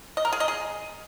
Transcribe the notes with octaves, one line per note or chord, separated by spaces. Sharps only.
D#5
A#4
G#4
D#5
G#4